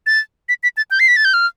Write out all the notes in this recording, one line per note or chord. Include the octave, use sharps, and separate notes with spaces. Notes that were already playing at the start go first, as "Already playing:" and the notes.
A6
B6
B6
A6
G6
C7
B6
A6
G6
F6